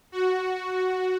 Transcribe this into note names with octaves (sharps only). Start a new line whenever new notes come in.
F#4